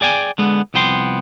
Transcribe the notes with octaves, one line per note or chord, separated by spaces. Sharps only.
G#4 D5 G5 G#5
D3 G#3 B3
C2 F3 B3 G5 C6